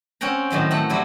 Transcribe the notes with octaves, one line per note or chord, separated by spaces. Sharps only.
C4 C#4 F#5 G5 A#5
A2 D#3 F#3 C6
A3 C4 F#5
F#3 G3 E4